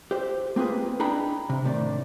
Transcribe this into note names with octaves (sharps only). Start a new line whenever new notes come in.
G4 C5
A#3 C4 F4 G#4 B4
D4 D#4 G#4 G5 A#5 B5
C3
A2 C3 D#3 D4